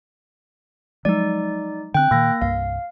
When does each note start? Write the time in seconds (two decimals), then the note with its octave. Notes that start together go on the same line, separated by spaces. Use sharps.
1.05 F3 F#3 G#3 D#4 D5
1.94 D3 C4 G5 F#6
2.11 A#2 D#3 A#3 A#6
2.42 C2 G2 F5